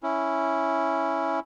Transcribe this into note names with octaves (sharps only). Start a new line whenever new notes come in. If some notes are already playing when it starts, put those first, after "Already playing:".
C#4 E4